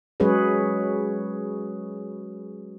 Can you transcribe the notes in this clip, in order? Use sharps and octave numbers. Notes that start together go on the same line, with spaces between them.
F#3 G#3 C#4 G#4 B4 C#5